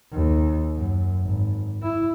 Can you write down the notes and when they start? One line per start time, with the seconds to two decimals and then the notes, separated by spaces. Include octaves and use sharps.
0.12 D#2
0.76 F#2
1.20 G#1
1.83 E4